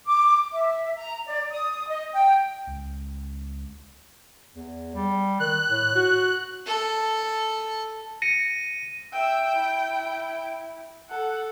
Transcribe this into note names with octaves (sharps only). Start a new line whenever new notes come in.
D6
E5
A#5
D5
D#6
D#5
G5
C#2
E2
G3
D#3 F#6
A2
F#4
A4
A#6 C#7 D#7
E5 G5 E6
E4
A4 F#5